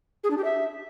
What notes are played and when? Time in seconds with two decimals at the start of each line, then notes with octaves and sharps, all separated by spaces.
0.24 G#4
0.30 D4
0.37 G4
0.44 E5